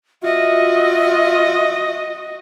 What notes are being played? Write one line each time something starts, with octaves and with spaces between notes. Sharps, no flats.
F4 F#4 D#5 E5